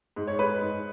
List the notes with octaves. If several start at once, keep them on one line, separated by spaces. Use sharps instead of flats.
G#2
C#5
G#3 B4
G#2